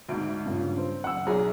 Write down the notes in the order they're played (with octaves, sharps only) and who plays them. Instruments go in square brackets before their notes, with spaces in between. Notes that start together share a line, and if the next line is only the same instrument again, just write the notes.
[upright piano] D2 G#2 [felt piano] E5 D7
[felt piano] G2 A#2 C#3
[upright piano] C4
[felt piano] F#1 [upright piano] F#5 E6
[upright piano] B1 [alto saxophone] G#4 [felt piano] D5 E5 A#5